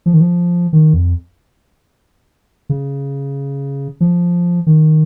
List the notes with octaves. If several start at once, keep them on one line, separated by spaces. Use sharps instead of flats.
F3
D#3
F3
D#3
F2
C#3
F3
D#3